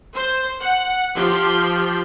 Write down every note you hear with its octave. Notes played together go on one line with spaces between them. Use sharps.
C5
F#5
F3 G4 C6